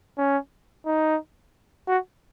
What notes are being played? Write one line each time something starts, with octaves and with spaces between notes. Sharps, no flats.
C#4
D#4
F#4